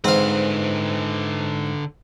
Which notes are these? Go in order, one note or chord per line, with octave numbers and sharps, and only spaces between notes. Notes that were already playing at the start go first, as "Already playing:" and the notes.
G#2 D3 C4 B4 F5